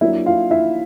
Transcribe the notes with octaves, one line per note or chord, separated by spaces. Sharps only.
F#3 A#3 D4 E4 F4 E5
F4 F5
E4 E5